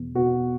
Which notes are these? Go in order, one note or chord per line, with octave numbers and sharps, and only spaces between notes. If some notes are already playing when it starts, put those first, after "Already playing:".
Already playing: E2 B2
B2 F#4